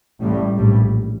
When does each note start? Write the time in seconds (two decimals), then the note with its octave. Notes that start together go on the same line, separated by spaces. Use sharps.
0.21 A1 A2 G3
0.58 A#1 A2 G3